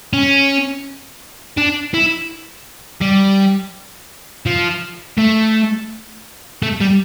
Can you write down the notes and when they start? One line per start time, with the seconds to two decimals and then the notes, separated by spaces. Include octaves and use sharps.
0.13 C#4
1.57 D4
1.94 E4
3.01 G3
4.46 F3
5.18 A3
6.62 A3
6.80 G3